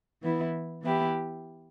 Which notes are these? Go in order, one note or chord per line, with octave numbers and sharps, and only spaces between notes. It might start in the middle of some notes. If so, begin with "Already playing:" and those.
E3 B3 E4
E3 B3 E4 G4